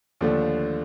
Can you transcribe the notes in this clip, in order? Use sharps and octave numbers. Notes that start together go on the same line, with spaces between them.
D#2 D3 F3 A3 D4